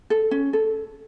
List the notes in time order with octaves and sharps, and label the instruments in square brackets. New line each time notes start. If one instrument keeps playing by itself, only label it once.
[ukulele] A4
C#4
A4